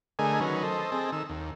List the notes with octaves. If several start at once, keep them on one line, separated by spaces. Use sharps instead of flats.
D3 A3 G#4 A#4 D#5 G#5
D#3 F#3 C#4 A#4 B4
A4 C5 D#5
C4 G#4 A4 D#5
D#3 E6
D#2